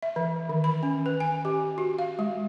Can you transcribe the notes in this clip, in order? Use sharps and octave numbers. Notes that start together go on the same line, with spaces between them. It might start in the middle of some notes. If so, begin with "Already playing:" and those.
E5
E3
D#3
B5
C#4
B4
G#5
G4
F#4
F5
G#3